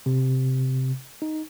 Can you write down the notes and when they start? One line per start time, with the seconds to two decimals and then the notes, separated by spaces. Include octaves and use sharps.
0.06 C3
1.22 D#4